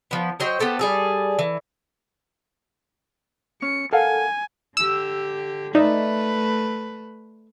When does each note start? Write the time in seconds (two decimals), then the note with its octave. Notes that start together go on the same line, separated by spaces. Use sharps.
0.11 F3 B3
0.40 F#3 C5 D#5 G5
0.59 B3 G4 A4 C5
0.79 G3 G#4 A4
1.39 E3
3.62 C#4 C#7
3.93 A4 A#4 F5 F#5 G#5
4.77 D3 G4 E6
5.75 A3 D#4 B4 D5 E5